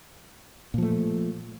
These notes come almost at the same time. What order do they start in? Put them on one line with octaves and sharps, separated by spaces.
A#2 F3 A3